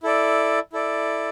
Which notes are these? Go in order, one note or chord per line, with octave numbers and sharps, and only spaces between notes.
E4 A4 D5
E4 A4 D5